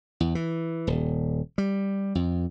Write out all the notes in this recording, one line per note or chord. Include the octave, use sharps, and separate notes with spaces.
E2
E3
D#1
G3
F2